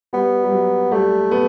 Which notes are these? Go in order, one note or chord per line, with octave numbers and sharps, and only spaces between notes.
G3 B3
G3
F#3
G3 A3
B3